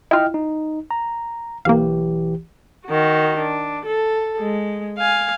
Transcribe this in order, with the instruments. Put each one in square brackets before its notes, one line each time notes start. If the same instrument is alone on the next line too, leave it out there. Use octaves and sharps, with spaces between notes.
[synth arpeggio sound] E4 F4 [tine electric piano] D#5 G5 F6
[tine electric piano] D#4
A#5
[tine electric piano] B1 E3 G4 [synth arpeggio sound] A#3 F5
[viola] D#3 F#4
D4
A4
G#3
F5 G#5